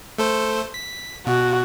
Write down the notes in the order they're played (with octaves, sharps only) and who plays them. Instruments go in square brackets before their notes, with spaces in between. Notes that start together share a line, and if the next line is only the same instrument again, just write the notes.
[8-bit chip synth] A3 A4 C5
B6
[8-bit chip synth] B2 [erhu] F#4